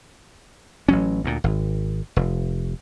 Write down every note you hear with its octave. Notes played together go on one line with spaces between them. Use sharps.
A1 F#3 C#4
D2 A#2
G#1
F1